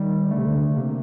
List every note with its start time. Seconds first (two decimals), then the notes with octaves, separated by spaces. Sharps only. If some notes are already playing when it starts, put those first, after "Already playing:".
Already playing: D#3 G3
0.31 D3 A3
0.38 C3
0.45 D3
0.77 C3 A#3